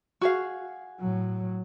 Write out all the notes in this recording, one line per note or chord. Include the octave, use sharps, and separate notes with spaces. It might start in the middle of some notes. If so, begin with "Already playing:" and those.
F#4 G#4 F5
A2 F#3